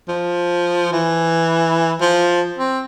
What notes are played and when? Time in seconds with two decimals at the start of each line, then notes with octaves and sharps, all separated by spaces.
0.08 F3
0.92 E3
2.01 F3
2.58 C4